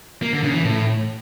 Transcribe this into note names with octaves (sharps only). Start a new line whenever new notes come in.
A#3
D3
C#3
E3
A2